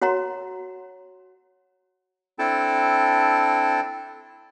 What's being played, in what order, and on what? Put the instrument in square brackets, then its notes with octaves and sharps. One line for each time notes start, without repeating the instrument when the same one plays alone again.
[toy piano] F#4 C#5 F#5 A#5 C6
[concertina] C4 D4 E4 A4 G5 A5